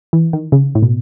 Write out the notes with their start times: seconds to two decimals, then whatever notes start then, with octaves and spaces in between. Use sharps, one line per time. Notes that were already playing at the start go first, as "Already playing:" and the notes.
0.13 E3
0.33 D#3
0.52 C#3
0.75 A2
0.82 B2